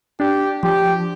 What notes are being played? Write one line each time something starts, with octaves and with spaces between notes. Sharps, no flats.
D4 G4
F3 G4